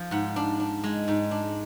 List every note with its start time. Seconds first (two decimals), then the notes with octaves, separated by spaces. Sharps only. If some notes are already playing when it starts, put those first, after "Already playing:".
Already playing: F3
0.11 G#2 F#5
0.36 D4
0.60 D4
0.84 G#3
1.08 G#2
1.31 D4